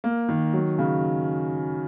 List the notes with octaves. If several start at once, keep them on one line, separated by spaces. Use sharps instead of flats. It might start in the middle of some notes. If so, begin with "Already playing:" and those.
A#3
D#3
F#3
C#3